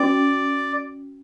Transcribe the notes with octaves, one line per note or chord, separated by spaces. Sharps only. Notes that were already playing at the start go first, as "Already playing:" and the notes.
Already playing: C#4 F#4 B4 D5 G5